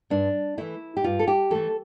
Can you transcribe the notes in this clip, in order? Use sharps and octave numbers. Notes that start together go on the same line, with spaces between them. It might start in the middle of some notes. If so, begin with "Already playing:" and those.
G2 D4
E3 A3 E4
G4
G2 F4
A4
G4
E3 A3 A4